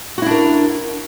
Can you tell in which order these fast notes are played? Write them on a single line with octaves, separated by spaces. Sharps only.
F#4 E4 D4 A#4